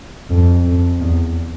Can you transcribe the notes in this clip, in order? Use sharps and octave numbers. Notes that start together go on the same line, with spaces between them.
F2
F2
E2